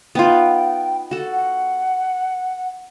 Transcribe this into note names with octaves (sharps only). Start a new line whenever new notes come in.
B3 D#4 F4 G5
F#4 A4
F#5